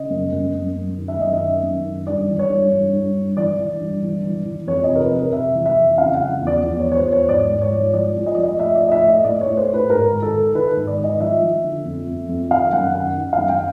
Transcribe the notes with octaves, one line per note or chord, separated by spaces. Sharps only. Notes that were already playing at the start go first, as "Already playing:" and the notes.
Already playing: C#3 D#5
F#2
F#2
F#2
F#2
D#3
E5
F#2 D#5
E5
D#3
F#2
D#3
G2 D5
E3
C#5
G2
G2
G2
G2
E3 D5
E3
G2
E3
E3
E3
F2 C#5
D#5
C3
A#4
B4
F2
A#4
C3 E5
E3
E5
F2
C#3 F5
F#5
F3
E2
D5
E2
C#5
F3
C#5
C5
E2
C#5
G#2 D5
G#2
C#5
F3
F3 D5
F3
D#5
F3 D5
D#5
A2 E5
D5
A2
D#5
E5
A2
D#5
A2 D5
C#5
A2
C5
A2
B4
G#2 A#4
D#3
A4
D#3
D#3 B4
G#2
D5
D#3
D#5
F3 E5
F3
D3
F2
F2
F2
D#3 F5
F#2 F#5
D#3 F#5
D#3
F5
F#2
G5